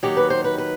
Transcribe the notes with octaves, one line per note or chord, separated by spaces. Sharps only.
D#2 D#3 F#3 G4
B4
C5
B4
B4